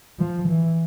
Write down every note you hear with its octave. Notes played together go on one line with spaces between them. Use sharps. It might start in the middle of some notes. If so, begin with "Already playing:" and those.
F3
E3